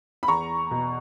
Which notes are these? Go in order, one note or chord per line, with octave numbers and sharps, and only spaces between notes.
B5
E2 A#5 C#6
B2